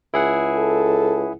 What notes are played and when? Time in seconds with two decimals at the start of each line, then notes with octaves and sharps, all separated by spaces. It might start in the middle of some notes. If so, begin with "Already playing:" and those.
0.14 C#2 E4 G#4 F#5
0.56 A4